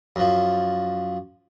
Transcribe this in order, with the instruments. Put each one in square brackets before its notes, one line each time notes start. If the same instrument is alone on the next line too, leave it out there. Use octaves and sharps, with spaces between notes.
[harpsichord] F#2 F3